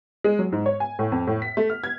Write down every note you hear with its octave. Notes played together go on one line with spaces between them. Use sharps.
G#3
F#3
G#2
C#5
G#5
A2
F2
A2
B6
A3
F6
G#6